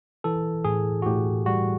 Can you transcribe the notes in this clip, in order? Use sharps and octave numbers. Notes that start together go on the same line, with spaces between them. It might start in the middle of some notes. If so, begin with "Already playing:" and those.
E3 A4
A2 G#4
F#4
A2 G4
G3 F#4